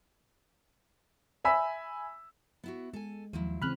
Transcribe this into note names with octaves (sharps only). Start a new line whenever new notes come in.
E5 G#5 B5 E6 B6
B3 E4 F#4
G#3 A4 G#5
D#2 F3 F#3 E4
C#3 E3 C4 C#4 G#4 B5 F6 F#6